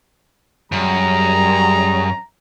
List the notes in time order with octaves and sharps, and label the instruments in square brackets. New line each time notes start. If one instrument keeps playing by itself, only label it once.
[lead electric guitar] F#2 [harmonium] G3 G#4 [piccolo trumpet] A#5